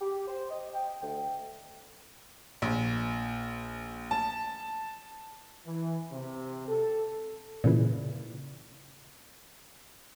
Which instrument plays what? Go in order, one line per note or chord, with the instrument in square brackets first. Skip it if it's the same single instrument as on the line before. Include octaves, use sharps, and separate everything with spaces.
[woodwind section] G4
C5
D#5
G5
D2
[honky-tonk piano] A#1
A5
[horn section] E3
C3
A4
[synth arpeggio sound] A#2 C#3 E3